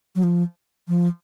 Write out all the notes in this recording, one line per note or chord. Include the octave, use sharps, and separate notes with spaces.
F#3
F3
F3